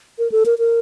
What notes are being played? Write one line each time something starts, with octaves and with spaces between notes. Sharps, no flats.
A#4
A4
A#4
A#4